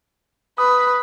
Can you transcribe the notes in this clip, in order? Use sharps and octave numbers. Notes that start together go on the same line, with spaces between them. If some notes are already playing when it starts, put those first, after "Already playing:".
B4 D#6